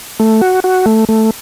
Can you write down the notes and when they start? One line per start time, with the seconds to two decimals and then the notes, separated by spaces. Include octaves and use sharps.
0.20 A3
0.41 F#4
0.64 F#4
0.86 A3
1.09 A3